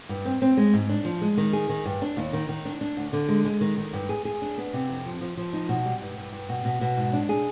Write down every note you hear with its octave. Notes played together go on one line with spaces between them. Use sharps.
G2
C4
C4
G#3
G#2
D4
F3
G#3
D#3
G#4
D#3
G2
D4
D#2
D#3
D#3
D4
D4
D2
D3
G#3
G#3
D#3
D#3
G2
G#4
G#4
D4
B3
C3
F2
F3
F3
F3
D#4
B2
G3
G2
G2
G2
B2
B2
B2
G#2
D4
G#4